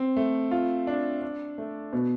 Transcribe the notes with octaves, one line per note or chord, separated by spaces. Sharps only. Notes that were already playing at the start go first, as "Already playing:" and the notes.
Already playing: C4
A3
F4
D4
D4
A3
B2